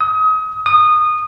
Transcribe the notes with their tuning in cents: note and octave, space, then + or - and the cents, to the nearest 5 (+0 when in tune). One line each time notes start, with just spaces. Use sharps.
D#6 +30
D#6 -20